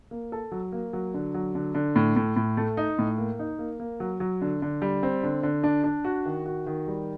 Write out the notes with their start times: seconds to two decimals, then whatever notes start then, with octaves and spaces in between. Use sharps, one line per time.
0.11 A#3
0.32 A4
0.52 F#3
0.72 A#3
0.93 F#3
1.14 D3
1.34 F#3
1.55 D3
1.75 D3
1.96 A2
2.16 A2
2.36 A2
2.57 A3
2.77 D#4
2.99 A2
3.18 A#3
3.39 D#4
3.59 A#3
3.80 A#3
4.00 F#3
4.20 F#3
4.42 D3
4.62 D3
4.82 G3
5.03 C4
5.23 D3
5.43 D3
5.64 D4
5.84 D4
6.04 F#4
6.25 D#3
6.46 F#4
6.66 D#3
6.88 G3